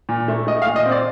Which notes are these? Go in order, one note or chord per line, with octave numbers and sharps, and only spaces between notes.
A#2
A3
A3 D#5
F5
A#2
D#5
C4
D5